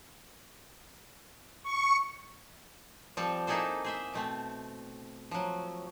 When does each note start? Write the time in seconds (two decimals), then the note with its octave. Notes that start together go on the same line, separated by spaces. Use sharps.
1.63 C#6
3.17 F3 G3 C4 A4
3.47 A#3 D#4 E4 G#4 A4 C5
3.84 G#4 C5 E5
4.14 B2 A3 C4
5.31 F3 F#3